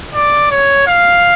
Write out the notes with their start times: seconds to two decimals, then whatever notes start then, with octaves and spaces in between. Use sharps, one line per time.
0.14 D5
0.51 C#5
0.87 F5